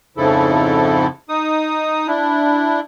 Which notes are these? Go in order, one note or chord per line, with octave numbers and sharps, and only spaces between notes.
F2 G#2 C#3 F3 E4 A4
D#4 D#6
D4 E4